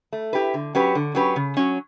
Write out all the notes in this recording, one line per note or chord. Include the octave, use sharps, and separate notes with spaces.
A3
E4 G4 B4
D3
F#3 C#4 G4 B4
D3
F#3 C#4 G4 B4
C#3
F#3 C#4